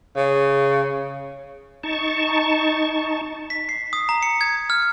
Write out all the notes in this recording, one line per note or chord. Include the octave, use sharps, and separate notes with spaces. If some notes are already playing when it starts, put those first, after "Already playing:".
C#3
D#4 A5 C#6
B6
C7
D#6
A#5
C#7
G#6
F6